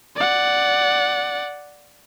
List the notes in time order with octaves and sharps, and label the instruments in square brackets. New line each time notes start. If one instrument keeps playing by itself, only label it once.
[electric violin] D5 F#5